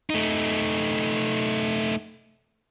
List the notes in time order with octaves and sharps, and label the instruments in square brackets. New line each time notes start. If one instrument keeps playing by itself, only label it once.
[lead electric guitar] A3 D#4